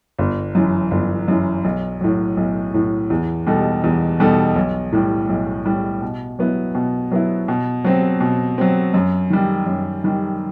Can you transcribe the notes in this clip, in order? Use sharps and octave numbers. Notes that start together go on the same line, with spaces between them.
G1
F#2 E3
G1
F#2 E3
B1
A2 F#3
B1
A2 F#3
E2
B2 G3 D#4 A4
E2
B2 G3 D#4 A4
B1
A2 G3
B1
A2 G3
B2
F#3 B3 E4
B2
F#3 B3 E4
B2
F#3 C4
B2
F#3 C4
F#2
D#3 G3
F#2
D#3 G3